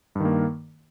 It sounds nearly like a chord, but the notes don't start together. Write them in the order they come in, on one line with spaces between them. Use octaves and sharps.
G2 D#3 A#3